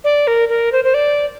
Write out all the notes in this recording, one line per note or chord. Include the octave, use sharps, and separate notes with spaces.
D5
A#4
A#4
C5
C5
D5